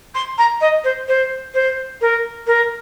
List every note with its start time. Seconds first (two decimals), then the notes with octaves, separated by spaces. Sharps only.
0.14 C6
0.38 A#5
0.61 D#5
0.84 C5
1.08 C5
1.54 C5
2.01 A#4
2.47 A#4